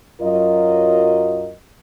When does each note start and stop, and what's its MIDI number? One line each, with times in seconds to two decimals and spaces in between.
0.21 1.53 42
0.21 1.53 54
0.21 1.53 65
0.21 1.53 70
0.21 1.53 75